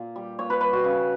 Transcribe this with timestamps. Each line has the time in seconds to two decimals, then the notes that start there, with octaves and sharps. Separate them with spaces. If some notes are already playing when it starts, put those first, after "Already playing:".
Already playing: A#2
0.16 G3
0.39 A#2 C#5
0.50 B4
0.61 G3 B4
0.73 F#4
0.84 C#3